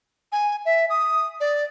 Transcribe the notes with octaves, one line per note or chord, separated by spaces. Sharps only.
G#5
E5
D#6
D5